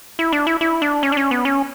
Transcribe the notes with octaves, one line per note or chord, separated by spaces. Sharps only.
E4
D4
E4
E4
D4
C#4
D4
C#4
B3
C#4